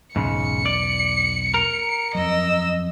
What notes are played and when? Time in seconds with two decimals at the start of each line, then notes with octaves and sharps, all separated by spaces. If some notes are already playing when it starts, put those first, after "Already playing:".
0.16 B1 E2 G#2 C#3 C#7
0.66 D5
1.54 A#4
2.15 F2 F#3 D#5 E6